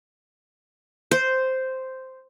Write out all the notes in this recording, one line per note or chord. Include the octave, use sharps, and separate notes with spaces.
C5